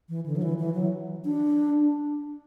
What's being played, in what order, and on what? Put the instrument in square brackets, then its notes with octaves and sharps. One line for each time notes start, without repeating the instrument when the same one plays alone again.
[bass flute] E3
D3
F#3
E3
E3
F#3
D4